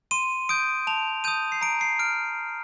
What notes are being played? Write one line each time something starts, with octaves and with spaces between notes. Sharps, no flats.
C6 D#7
D#6 G6 D7
A5 F7
D#6 G6 D#7
C7
A#5 D7
C7
F6 D7